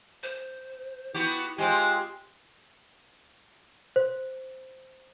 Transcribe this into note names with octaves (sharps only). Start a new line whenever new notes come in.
C5
B3 E4 F#4 G4
G#3 C4 F4 G4 G#5
C5